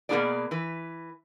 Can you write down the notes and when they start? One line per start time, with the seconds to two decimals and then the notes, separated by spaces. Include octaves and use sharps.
0.09 B2 A#3 B3 E4 G#4 D5
0.51 E3 B4